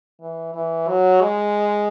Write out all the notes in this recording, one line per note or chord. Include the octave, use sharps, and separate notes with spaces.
E3
E3
F#3
G#3